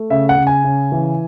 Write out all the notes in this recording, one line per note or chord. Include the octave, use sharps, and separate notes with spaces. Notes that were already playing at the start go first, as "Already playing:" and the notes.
Already playing: A3
C#3 E5
F#5
C#3
G#5
C#3
E3